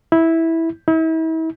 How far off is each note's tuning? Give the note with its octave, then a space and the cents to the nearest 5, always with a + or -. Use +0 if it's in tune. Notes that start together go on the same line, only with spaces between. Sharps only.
E4 -10
E4 -40